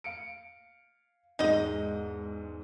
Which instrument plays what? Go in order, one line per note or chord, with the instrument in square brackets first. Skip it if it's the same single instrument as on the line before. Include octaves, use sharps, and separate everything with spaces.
[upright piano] F5 C#7 D7
[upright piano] E1 G#2 G#3 [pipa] D#4 D#5